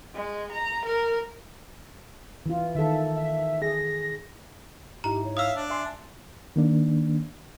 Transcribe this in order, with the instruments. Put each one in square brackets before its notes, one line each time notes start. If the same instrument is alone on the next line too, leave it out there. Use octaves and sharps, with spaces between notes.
[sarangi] G#3
A#5
A#4
[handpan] E3 F4
[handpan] D#3 A4 [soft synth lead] E5
[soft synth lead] E5
[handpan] G#4 [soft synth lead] A#6
[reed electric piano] G#2 D#4 E4 [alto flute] G4 [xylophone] A#5
[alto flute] C#5
[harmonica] E5 F5 [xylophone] D#6 E6
[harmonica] D4
[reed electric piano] E5 C6 [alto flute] G#5
[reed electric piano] D#3 A#3 D4